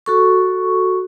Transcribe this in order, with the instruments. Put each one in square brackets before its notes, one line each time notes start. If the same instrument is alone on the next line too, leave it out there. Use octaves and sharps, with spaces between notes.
[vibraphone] F#4 A4 C#6